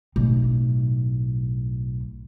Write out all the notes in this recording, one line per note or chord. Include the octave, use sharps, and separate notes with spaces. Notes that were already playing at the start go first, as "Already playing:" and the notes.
B1 A2